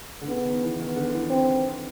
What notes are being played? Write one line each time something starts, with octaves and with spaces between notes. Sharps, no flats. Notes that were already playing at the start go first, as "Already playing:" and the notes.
D3
C#3 B3
D#3
E3
D#3 B3
D3
E3
C4